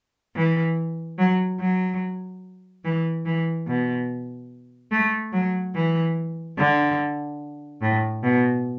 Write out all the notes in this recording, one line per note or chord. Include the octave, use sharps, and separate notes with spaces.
E3
F#3
F#3
E3
E3
B2
A3
F#3
E3
D3
A2
B2